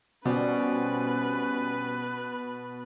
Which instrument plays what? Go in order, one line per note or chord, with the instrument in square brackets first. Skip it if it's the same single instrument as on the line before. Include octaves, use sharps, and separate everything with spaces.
[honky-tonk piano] B2 [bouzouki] G3 C4 [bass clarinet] C#4 [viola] B4